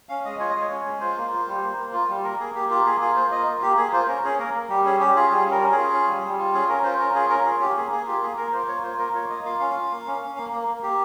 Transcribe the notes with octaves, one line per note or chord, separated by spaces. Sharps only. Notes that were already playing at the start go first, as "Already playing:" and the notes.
C#4 F5
G#3 D#5
F4 C#5
D#5
G#3
C#5
C#4
G#3
F4 C5
A#3
F4
G3
A#3
A#3
F4
G3
A#3 A#4
A#3 G#4
A#3 G4
F4 G4
A#3 G#4
F4 G#4
A#3 C5
F4 D#5
A#3
A#3 G4
A#3 G#4
F4 C5
C#4 A#4
C#4 G#4
A#3 A#4
A#3
G3 G4
C#4 G#4
C#4 G4
F4 G#4
G3 G#4
C#4
A#4
C#4
G#4
F4
C#4
G3
G3
F4
C#4 G#4
C#4 A#4
F4 C5
C#4 A#4
F4 G#4
C#4 A#4
F4 G#4
C#4 G4
A#3 G#4
A#3 G#4
F4 G4
A#3 G#4
A#3 A#4
F4 C5
A#3 C#5
F4 C5
A#3 A#4
F4 C#5
A#3 D#5
F4 F5
C#4 F5
F4
A#3
C#4
C#4
A#3
A#3
A#3
A#3 G4